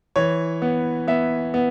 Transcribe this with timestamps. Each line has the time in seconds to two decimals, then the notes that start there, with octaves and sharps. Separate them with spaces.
0.16 E3 C#5
0.62 B3
1.08 B3 E5
1.54 B3